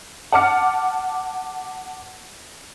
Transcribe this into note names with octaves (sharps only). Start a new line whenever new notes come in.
F#5 A5 D6 F6 C#7